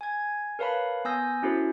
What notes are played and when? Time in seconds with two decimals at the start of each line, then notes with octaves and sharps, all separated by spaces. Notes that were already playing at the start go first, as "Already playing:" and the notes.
0.01 G#5 G#6
0.59 A#4 B4 C#5 F5 A5 B5
1.05 B3 G#5 D#6 E6 G6 A#6
1.43 C#4 E4 F#4 A4 C5